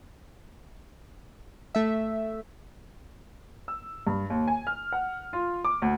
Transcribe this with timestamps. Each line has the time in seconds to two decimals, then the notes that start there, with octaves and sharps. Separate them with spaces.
1.75 A3 E5
3.68 E6
4.07 G2
4.30 D#2
4.48 G#5
4.67 F6
4.93 F#5
5.33 F4
5.65 D6
5.82 D2